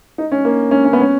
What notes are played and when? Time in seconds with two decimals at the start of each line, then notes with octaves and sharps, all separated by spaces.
0.18 D#4
0.32 C#4
0.45 A#3
0.71 C#4
0.85 C#4
0.93 B3
1.01 C#4